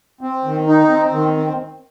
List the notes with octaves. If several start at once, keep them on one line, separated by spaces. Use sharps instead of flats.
C4
D#3
D#4
C4
D#3
C4